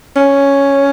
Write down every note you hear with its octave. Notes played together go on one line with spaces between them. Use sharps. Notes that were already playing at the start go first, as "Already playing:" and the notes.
C#4